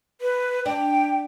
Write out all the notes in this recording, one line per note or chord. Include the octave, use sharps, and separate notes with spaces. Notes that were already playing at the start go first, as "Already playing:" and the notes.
B4
D4 G5